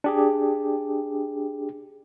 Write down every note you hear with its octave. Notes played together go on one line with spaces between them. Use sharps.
D4 G4 G#4